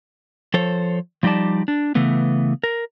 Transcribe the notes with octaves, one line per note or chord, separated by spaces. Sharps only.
F3 A4 C5 C#5
F3 G3 D#4 G4 D5 A5
D4
C#3 E3 A3 B3
A#4